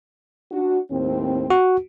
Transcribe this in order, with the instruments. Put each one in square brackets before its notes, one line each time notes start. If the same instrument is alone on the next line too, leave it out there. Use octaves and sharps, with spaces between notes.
[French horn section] D4 F#4
D#2 A2 C4
[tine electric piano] F#4